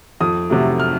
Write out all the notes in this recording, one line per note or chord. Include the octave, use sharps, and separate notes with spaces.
F2 D#6
C3 F#3 A3
F6